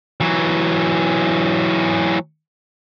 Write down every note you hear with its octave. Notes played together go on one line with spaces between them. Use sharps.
E3 F#3